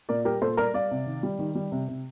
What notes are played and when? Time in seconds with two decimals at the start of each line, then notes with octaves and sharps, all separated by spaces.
0.09 A#2 A#4 D5
0.25 G3 G4 A#4
0.42 A#2 A4 C5
0.57 G3 A#4 D5
0.74 G3 D5 F5
0.91 C3
1.06 D#3
1.23 G3
1.39 D#3
1.55 G3
1.72 C3
1.88 C3